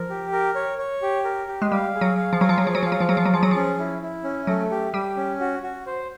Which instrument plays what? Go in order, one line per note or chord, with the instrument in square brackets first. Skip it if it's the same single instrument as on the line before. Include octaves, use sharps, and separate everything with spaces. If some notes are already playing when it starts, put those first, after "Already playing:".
Already playing: [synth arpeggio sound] F3 [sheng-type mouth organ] A#4
[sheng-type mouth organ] G4
A#4
C#5
C#5
G4
A#4
G4
[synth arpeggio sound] G#3
[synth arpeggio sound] G3 [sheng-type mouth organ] F5
[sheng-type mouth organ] G#4
[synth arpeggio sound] F#3
[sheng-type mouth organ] F5
[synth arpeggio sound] F3
[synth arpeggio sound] F#3 [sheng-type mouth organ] G#5
[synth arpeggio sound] F3
F#3
[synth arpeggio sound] F3 [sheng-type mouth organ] G#4
[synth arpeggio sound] F#3
[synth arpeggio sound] F3 [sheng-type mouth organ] F5
[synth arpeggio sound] F#3
F3
[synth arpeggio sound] F#3 [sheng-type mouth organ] G#4
[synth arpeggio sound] F3
F#3
[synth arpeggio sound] F3 [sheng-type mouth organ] G#4
[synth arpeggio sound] F#3
[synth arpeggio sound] F3 [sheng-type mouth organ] C#4
[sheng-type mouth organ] E4
E4
C#4
[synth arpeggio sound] F#3 [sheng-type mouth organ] A3
[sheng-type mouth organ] G4
[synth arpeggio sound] G3 [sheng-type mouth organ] G4
[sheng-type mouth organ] C#4
F#4
F#4
C5